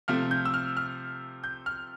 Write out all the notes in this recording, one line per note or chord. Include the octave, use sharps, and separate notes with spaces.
C3 F3 A3 C4 F6
G6
E6
F6
F6
G6
F6